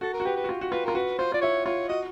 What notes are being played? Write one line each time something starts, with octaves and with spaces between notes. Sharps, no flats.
F#4 A4
A#4
F#4
G4 B4
B4
F#4
F4
F#4
F4 B4
F4 A#4
F#4 B4
F4 C5
F4 D5
E4 C#5
F4 C#5
F#4 D#5